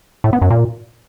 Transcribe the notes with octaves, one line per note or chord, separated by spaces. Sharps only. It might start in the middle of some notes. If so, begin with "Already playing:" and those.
A2
B3
F#2
A#2